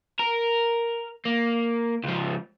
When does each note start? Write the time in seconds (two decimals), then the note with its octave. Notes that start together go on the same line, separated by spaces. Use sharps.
0.19 A#4
1.25 A#3
2.04 C#2 F3